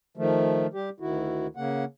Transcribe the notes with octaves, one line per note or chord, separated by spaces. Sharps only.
D#3 F3 A3
G3 G4
D2 D#3 E4 F#4
C#3 A#3 F#5